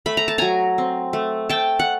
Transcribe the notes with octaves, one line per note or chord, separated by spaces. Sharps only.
A3 B5
A#5
A5
F#3 G#5 A#5
C4
A3
A3 G5 A5
F#5